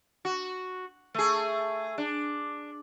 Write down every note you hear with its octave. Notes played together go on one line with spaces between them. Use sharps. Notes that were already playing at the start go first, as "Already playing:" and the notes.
F#4
A3 G#4
D4